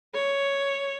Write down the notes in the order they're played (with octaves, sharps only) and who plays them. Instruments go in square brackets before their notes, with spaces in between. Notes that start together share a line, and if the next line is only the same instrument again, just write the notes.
[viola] C#5